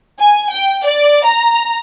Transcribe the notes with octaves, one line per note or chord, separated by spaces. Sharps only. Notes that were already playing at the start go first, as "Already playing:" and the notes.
G#5
G5
D5
A#5